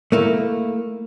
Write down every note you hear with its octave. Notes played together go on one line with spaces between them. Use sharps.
A3 A#3 E4